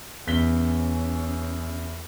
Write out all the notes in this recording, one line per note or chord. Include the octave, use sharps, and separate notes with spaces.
E2 C#4 B6 G7